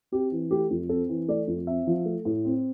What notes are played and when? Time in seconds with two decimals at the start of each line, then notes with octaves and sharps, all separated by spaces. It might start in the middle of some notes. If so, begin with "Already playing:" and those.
0.12 C4 G4
0.32 E3
0.51 A3 G4
0.71 F2
0.89 C4 A4
1.09 E3
1.28 A3 D5
1.48 F2
1.67 C4 E5
1.87 F3
2.06 A3
2.25 A2
2.45 C4